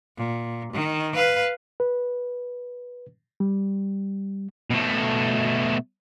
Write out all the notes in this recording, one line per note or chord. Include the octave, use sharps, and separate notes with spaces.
A#2
D#3
B4 F5
B4
G3
B2 A3